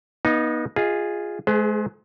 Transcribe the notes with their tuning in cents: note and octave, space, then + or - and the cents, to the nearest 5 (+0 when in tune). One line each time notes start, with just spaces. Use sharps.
B3 -30 D#4 +0 F5 +0
F4 +0 G#4 -10 D#5 +25
G#3 +40 G#4 +0 C5 -35